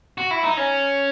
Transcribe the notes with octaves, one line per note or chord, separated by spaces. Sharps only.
F#4
E4
D#4
C#4